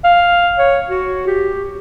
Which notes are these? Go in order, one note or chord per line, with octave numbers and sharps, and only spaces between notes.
F5
C#5
F#4
G4